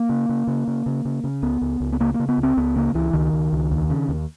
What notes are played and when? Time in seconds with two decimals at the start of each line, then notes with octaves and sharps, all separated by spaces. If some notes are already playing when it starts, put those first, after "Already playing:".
Already playing: A#3
0.09 C#3
0.29 C#3
0.47 C#3
0.68 C#3
0.86 C#3
1.05 C#3
1.24 C#3
1.42 C#2 B3
1.61 C#2
1.80 C#2
1.93 B3
2.00 C#3 A#3
2.14 A#3
2.20 C#3
2.29 B3
2.38 C#2
2.43 C4
2.57 C#2 B3
2.76 C#3 A#3
2.94 C#2 E3
3.13 C#2 D#3
3.33 C#2
3.53 C#2
3.72 D#2
3.90 C#3
4.08 D#2